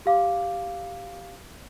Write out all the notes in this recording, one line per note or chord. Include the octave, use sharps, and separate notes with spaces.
G4 F5 D6